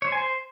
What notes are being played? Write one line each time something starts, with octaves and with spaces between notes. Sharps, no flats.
C#5
C5
G#5
C5